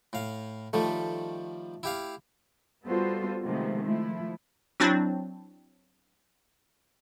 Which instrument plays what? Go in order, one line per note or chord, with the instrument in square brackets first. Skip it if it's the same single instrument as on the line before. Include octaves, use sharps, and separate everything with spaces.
[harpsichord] A2 F5
[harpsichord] D#3 F3 G3 [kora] A3
[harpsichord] E4 G4 F5
[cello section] G3 B3 F4 F#4 A4 C5
C3 D#3 F3 G#3 A3 B3
F3 A3 E4
[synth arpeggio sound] F#3 C4 D4 E4